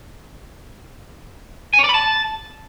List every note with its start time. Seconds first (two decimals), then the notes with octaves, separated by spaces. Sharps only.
1.73 G#5
1.79 C#5
1.84 D5
1.89 B5
1.94 A5